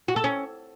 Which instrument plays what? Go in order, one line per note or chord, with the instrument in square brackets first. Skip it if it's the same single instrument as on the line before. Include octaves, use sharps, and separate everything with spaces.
[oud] F#4
A4
C#4